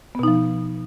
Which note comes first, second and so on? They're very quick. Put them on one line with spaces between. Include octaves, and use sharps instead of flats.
B3 B2 D#4 F3